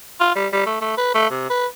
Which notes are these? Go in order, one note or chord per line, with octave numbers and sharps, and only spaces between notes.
F4
G3
G3
A3
A3
B4
A3
C3
B4